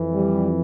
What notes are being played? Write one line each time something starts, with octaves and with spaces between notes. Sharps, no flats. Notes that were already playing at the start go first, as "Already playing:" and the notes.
Already playing: F2 E3
G3